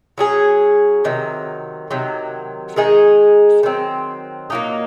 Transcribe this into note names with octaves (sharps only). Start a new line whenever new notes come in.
F#3 C#4 G#4
C3 D#3 F#3
C3 D#3 F#3
D#3 G#3 D#4 G#4
D#3 F#3 C4
A#2 F#3 A#3 D#4